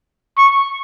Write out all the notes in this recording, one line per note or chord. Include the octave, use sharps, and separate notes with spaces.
C#6